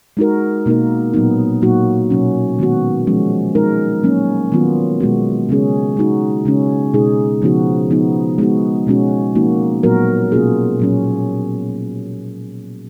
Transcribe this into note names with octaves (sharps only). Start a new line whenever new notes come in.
G#3 D#4 F#4 A#4
B2 A#3 D#4 A#4
A#2 F#3 B3 D#4
A#2 F#3 A#3 D#4 F#4
B2 F#3 C#4
D#3 G#3 B3 F#4
F3 G#3 C#4
G#3 D#4 A#4
F#3 A#3 C#4
D#3 F#3 B3 F4
B2 G#3 B3 F#4
C#3 G#3 C#4 G#4
G#3 D#4 F#4
C#3 G#3 C#4
B2 G#3 D#4 G#4
C#3 F3 B3 D#4 F#4
F3 B3 D#4
G#3 B3 D#4 F#4
B2 G#3 C#4 F#4
F3 A#3 D#4 F#4
A#2 F#3 B3 F#4 A#4
B2 A#3 C#4 F4 G#4
A#2 F#3 C#4